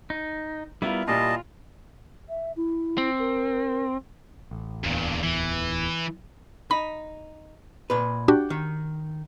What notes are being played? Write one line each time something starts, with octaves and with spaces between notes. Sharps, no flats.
D#4
G3 B3 E4 F4 A#4
A#2 G3 E4 F4 D#5 A5
E5
E4
C4
A#4
A1
D1 E2 G2 A#2
E3
D#4 B5
A#2 B4
D4 F#4 G4
D#3